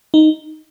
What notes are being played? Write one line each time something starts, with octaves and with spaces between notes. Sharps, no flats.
D#4